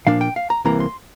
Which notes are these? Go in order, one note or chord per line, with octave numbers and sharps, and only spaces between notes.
A#2 F3 A#3 D4 F5
G5
F5
A#5
C2 C3 E3 A#3 A#5
C6